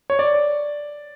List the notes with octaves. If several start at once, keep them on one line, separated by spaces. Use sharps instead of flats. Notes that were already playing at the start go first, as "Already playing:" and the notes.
C#5
D5